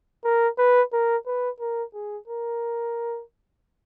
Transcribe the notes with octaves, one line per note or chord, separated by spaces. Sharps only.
A#4
B4
A#4
B4
A#4
G#4
A#4